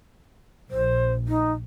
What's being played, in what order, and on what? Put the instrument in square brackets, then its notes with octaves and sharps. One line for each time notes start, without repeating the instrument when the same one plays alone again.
[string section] A#1 [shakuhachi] C5
[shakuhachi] D#4